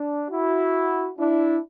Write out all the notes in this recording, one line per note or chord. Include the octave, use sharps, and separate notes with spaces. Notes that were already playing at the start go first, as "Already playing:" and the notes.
Already playing: D4
E4 F#4
D4 E4